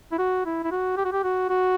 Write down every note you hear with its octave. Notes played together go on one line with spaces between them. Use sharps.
E4
F#4
E4
E4
F#4
G4
F#4
G4
F#4
F#4